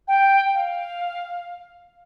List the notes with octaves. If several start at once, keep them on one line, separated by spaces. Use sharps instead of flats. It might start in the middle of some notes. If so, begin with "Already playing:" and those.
G5
F5